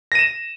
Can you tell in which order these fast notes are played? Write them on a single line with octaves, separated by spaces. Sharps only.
A#6 D#7 E7